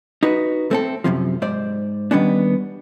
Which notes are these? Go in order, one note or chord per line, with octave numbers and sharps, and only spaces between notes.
D#4 F#4 B4
A3 C4 A4
F#2 A2 C3 F3
G#2 C5 D5
D#3 G3 B3 C#4 D4